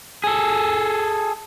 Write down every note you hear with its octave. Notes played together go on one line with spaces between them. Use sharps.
G#4 A4